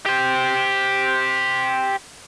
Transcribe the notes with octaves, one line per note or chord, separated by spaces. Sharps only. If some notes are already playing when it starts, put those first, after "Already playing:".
G4 C5